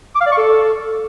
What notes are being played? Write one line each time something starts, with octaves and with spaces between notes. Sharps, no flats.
D6
F5
D5
C#6
A4